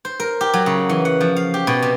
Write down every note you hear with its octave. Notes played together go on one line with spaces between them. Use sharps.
C5
A#4
G4
F#3
C#3
E3
F#5
F3
F5
G4
B2
C3